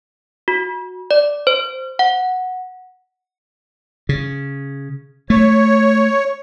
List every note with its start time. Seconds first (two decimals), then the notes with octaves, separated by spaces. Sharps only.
0.48 F#4
1.11 D5
1.47 C5
1.99 F#5
4.09 C#3
5.30 A3 C#5